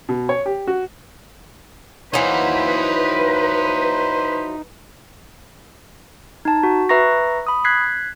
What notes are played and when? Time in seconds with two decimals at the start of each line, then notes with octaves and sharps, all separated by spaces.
0.09 B2
0.29 C#5
0.46 G4
0.67 F#4
2.14 E3 F#3 D#4 B4 C5 F5
6.45 D#4 A5
6.63 F#4
6.89 B4 E5 A#5 C#6 A#6
7.47 B5 D#6
7.65 F#6 G#6 B6 C7